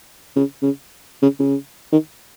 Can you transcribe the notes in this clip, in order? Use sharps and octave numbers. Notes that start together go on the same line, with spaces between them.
C#3
C#3
C#3
C#3
D#3